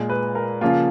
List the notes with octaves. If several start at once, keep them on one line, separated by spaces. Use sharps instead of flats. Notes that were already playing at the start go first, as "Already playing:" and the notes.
Already playing: A#2 G#3
B4
A#4
C#3 F3 A#3 F4